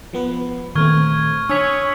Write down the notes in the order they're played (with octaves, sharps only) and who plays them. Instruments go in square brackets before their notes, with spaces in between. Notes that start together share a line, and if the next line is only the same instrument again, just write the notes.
[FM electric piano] F3 B3 B4
[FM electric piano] A#2 A3 C4 [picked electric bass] D#3 [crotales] C#6 F6 G#6
[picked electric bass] D4 [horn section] C#5 [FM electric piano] G#5 D#6 [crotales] E6 B6